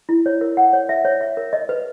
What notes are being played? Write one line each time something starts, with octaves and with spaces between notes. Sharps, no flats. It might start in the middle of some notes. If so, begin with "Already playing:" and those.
E4
C#5
A#4
F#5
C#5
E5
C#5
E5
A#4
D#5
B4